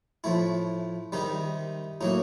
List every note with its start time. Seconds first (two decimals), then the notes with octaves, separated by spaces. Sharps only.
0.24 A2 F3 A3 E4
1.12 C3 D#3 G3 D#4
2.01 A2 F#3 A#3 D#4